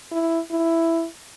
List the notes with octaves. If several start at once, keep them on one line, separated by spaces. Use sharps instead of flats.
E4
E4